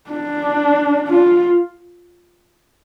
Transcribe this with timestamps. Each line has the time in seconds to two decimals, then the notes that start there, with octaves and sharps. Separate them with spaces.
0.10 D4
1.08 F4